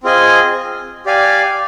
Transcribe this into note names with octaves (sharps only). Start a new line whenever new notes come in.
C4 F4 G#4 D#5 G#5
G4 D5 F5 G#5